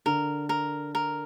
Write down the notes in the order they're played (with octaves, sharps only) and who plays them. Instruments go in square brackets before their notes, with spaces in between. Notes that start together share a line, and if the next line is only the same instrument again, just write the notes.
[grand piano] D3 [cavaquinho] A#4
[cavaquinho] A#4
A#4